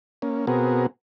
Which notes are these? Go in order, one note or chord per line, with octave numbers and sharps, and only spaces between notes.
A#3 C#4
B2 B3 C4 F#4 G#4 A#4